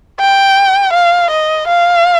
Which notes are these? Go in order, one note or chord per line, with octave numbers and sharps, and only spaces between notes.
G5
F5
D#5
F5